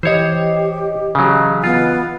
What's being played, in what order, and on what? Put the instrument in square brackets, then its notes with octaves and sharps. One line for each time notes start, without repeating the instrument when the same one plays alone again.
[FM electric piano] E3 D#5 [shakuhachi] G4 [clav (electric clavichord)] C5 C#5
[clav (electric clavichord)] C#3 F#3
[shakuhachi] B3 [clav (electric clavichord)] F4